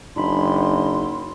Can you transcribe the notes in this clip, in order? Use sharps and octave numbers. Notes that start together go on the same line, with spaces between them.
F#1 D4 D#4 B5 C6